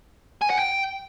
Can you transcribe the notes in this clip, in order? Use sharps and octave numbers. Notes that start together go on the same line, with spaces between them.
G#5
F#5
G5